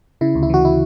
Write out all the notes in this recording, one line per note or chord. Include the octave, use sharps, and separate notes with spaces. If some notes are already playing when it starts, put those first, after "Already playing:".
C#3 E4
D2
E4
E3 F#4
E4